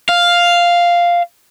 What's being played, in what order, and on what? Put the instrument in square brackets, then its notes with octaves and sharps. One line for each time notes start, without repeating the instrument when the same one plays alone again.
[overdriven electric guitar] F5